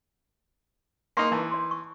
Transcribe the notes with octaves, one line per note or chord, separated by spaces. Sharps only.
A#3 D#4 G#5 C6 C#6
E3 A5
C#5 C6
C#6